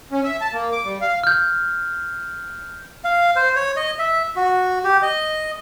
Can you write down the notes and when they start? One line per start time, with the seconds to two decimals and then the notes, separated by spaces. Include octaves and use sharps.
0.12 C#4
0.24 E5
0.41 A5
0.53 A#3
0.72 D6
0.85 G3
1.01 F5
1.24 F6 G6
3.04 F5
3.36 C5
3.56 C#5
3.76 D#5
3.99 E5
4.36 F#4
4.84 G4
5.02 D#5